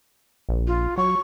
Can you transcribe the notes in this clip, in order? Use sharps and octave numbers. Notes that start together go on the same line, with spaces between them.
A#1
F4
F#3 C#6